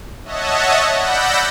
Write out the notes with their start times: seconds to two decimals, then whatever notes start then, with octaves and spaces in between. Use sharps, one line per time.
0.24 C#5 D#5 E5 F#5 A5
0.95 D5 F#5 B5 E6 G6 A#6